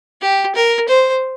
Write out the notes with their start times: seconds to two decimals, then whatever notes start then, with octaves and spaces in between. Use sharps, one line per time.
0.21 G4
0.55 A#4
0.88 C5